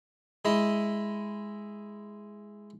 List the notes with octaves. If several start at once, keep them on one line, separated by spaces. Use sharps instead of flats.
G#3 E4 D#5 E5